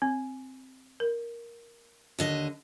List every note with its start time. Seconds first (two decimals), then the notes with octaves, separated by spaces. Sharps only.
0.02 C4
1.00 A#4
2.19 D#2 D3 D#5